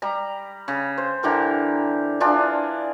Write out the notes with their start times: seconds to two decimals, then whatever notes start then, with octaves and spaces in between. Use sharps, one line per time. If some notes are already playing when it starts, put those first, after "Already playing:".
0.02 G3 A#5
0.68 C#3
0.98 C5
1.23 D3 E3 G4 A#4
2.20 E3 D4 F4 G#4